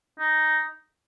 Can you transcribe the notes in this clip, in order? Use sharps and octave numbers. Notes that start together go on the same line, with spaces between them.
D#4